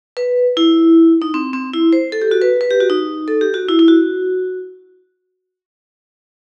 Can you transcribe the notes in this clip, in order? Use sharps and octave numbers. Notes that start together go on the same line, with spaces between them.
B4
E4
D#4
C4
C4
E4
C5
A4
G4
F#4
B4
B4
G4
F#4
D#4
A4
G4
F#4
E4
E4
F#4